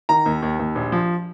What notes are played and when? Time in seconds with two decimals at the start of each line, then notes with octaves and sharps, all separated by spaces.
0.09 D#3 A#5
0.26 D#2
0.42 D#2
0.59 D#2
0.75 A#1
0.92 F3